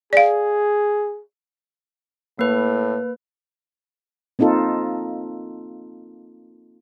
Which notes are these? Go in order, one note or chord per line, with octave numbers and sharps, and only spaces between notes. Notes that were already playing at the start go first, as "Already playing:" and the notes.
G#4 D5 F5
A2 A#3 B4
A#3 C4 D#4 F4 A4